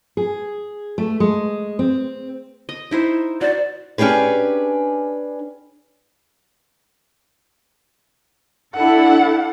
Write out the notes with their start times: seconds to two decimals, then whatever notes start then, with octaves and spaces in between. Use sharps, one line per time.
0.17 G#4
0.98 A3
1.20 G#3
1.79 C4
2.69 D#5
2.91 D#4 E4 C5
3.41 F#4 C5 D5
3.98 C#4 D4 G4 G#4 B4
8.75 D4 E4 A4 F#5